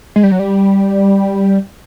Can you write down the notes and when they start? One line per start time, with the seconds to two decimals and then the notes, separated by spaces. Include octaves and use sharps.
0.16 G#3
0.23 G3
0.32 F#3
0.39 G3